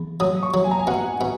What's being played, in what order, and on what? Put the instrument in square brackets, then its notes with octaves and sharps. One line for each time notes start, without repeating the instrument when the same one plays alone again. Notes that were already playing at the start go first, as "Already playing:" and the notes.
Already playing: [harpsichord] E2
[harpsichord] F#3 [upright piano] D#6
[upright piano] C#6
[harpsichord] F#3
[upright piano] G#5
A#5
G#5
[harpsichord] B2 [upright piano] F#5
[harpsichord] B2